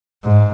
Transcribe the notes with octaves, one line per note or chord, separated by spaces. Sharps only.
G#2